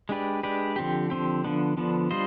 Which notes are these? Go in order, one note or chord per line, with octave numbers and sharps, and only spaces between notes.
G#3 D4 G4 B4 D5
G#3 D4 G4 B4 D5
D3 F3 C4 G4
D3 F3 C4 G4
D3 F3 B3 D4
D3 F3 B3 D4
G3 D4 F4 C5 D#5